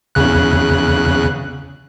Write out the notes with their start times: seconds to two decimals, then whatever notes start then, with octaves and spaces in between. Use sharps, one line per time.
0.15 E2 C#3 F#6